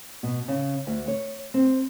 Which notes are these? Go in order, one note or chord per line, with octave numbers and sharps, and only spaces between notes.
B2
C#3
D2
C#5
C4